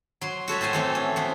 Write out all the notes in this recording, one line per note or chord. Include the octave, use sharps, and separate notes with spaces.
F#3 C6
F#4 A4 C#5 E5
A2 A4 C5 C#5 G#5
E3 A3 C4
C#4
F3 B3